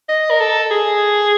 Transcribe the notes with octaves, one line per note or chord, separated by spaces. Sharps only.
D#5
A#4
A4
G#4